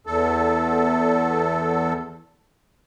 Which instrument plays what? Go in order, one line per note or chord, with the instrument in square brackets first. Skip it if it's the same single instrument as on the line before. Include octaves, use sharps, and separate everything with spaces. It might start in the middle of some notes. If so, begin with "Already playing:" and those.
[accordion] E2 A4